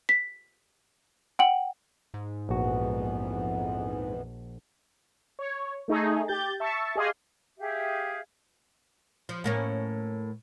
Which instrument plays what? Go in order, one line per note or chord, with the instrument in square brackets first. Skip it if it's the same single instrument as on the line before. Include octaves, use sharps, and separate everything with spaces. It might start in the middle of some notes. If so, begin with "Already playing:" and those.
[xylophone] B6
F#5 G5 F#7
[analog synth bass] G#2
[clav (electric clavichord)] A#1 F#4 [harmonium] F2 E3 B3
[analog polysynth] C#5
A3 D#4 G#4
G4 G6 A6
E5 A5 C#6
G4 G#4 D#5 F5 G#5 C6
[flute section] G4 G#4 E5 F5
[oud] F3
A2 A#3 C#4